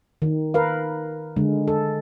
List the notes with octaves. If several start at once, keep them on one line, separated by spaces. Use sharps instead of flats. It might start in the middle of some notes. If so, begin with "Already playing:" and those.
D#3
A#4 B4 F5
D3 G#3
A4